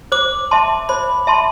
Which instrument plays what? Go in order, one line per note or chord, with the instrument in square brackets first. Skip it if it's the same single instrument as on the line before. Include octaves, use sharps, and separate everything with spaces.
[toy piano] C5 [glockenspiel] D6
[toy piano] E5 A5 C6
[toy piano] C5 [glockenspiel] B5
[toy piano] E5 A5 C6